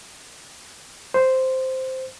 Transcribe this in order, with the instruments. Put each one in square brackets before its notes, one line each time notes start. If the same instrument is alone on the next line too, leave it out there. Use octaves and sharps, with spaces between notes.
[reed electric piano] C5